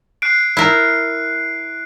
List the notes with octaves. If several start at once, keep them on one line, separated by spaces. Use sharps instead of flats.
F#6 C7 D7
E4 A#4